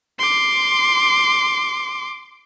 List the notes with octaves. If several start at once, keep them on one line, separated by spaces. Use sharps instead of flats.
C6 D6